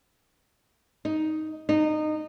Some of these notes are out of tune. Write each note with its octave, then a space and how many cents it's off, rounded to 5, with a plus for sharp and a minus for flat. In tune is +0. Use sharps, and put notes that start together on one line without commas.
D#4 +5
D#4 -20